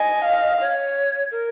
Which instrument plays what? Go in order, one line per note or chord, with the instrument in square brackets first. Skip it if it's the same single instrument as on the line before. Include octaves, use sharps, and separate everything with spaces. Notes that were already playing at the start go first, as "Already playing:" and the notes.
Already playing: [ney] D#5 [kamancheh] G#5
[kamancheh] F5
[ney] C#5
A#4